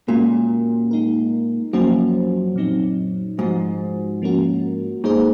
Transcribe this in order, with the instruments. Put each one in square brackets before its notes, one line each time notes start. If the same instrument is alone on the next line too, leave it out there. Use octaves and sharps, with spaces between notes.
[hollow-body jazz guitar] A#2 [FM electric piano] G#3 C#4 F#4 A#4
[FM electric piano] G#3 D#4 A#4
[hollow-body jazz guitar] F#2 [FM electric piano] F3 A#3 C#4 F#4 C5
[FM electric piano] A#2 F#3 C4 D#4
[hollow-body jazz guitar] G#2 [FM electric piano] F3 G#3 D#4 F#4 C5
[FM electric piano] F3 A#3 C#4 F#4 A#4
[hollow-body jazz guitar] G#2 [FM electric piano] A#3 D#4 G#4 C5